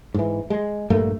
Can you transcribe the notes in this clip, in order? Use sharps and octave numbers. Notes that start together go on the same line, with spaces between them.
G#2 E3
G#3
A#1 G2 A3 A#3